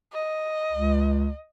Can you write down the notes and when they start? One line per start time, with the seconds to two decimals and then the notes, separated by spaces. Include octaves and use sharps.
0.13 D#5
0.72 C#2